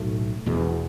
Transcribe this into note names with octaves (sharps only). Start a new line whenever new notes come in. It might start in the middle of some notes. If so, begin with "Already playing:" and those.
Already playing: B1 A2 A3
E1 E2 B2